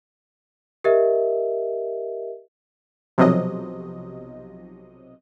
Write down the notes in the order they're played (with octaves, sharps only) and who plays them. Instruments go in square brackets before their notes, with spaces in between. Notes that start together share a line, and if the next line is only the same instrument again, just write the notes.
[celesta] G4 A#4 D#5 E5
[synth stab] B1 C3 F3 F#3 D#5